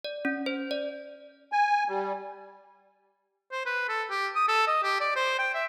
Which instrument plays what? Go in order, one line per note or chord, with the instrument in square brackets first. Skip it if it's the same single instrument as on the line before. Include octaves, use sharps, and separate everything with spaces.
[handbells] D5
C#4
C5
D5
[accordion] G#5
G3
[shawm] C5
B4
A4
G4
D#6
A4
D#5
G4
D5
C5
G5
E5